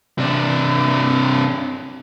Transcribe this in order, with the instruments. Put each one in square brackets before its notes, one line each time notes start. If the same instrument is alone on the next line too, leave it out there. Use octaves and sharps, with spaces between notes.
[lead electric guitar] C3 D4